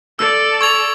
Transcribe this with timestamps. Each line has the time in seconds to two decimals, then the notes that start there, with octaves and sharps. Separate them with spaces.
0.19 A4 D5 E6
0.61 C#6 G#6 F7